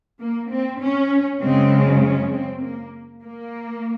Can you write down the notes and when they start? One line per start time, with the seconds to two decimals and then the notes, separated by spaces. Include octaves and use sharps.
0.20 A#3
0.50 C4
0.80 C#4
1.41 F#2 C#3 G#3 C4
2.01 C#4
2.31 C4
2.62 A#3
3.22 A#3